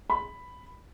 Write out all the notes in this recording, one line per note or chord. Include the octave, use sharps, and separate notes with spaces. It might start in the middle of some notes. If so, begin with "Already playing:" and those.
B5